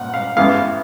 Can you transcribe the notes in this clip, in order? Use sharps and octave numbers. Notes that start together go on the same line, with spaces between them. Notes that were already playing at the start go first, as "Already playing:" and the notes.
Already playing: A#2 F#5
F5
A1 G2 E3 G#3 B3 F5